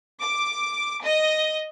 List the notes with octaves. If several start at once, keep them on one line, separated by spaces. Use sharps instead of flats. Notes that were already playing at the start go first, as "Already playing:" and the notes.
D6
D#5